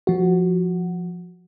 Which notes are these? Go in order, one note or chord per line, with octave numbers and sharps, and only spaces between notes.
F3 F#4